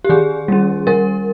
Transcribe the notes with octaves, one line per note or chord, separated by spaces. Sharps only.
G4
D#3 G#4
G3 C#4
G3 A#4